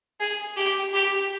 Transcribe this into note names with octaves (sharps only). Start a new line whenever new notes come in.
G#4
G4
G4